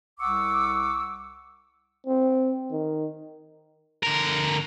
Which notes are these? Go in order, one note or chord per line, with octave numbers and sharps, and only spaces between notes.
C2 F#5 C#6 D6 E6
C4
D#3
D3 A#4